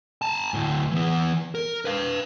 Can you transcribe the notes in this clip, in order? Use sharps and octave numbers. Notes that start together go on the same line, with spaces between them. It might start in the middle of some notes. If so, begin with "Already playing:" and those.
G#5 A5
D2 A2
E3 B3
A#4
B4 F5